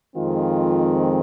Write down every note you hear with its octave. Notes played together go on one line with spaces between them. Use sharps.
F2 D#3 G#3 C4 F4